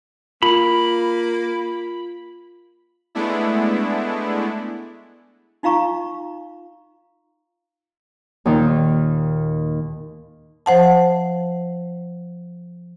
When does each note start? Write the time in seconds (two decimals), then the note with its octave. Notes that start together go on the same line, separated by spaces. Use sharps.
0.43 A#3 F4 B5
3.15 G#3 A3 B3 D4 E4
5.63 D#4 F4 F5 A#5 C#6
8.45 D#2 A#2 D#3
10.66 F3 C5 F#5 A5